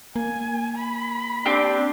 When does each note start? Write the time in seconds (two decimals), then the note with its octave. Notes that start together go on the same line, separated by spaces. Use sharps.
0.16 A#3 G#5
0.76 B5
1.46 C4 D4 G4